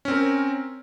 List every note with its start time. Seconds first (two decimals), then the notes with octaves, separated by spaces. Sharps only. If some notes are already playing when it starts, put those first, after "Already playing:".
0.05 C#4
0.08 C4
0.11 A#4